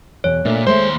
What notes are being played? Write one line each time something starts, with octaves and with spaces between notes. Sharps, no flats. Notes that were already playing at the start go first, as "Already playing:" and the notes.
E2 B2 C#5
A#2 A3 D4
D#2 G#3 A3 C5 C6